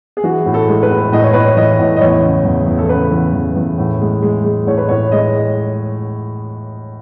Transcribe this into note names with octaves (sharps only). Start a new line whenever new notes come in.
G#4
E3 F#4
A2
A4
G#3
B4
A2
A2 D#5
C#5
A2 B4
C#5
E3 D#5
A2
D#5
E2 C#5
C#3
E2
E2
A4
C#3 B4
E2
E2
E2
A2
G#3
G#3
G#3
A2 C#5
B4
A2 C#5
G#3 D#5